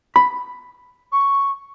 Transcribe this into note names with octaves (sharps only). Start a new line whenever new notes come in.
B5
C#6